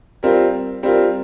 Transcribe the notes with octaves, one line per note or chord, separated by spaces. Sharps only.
G3 C4 F4 A#4
G3 C4 F4 A#4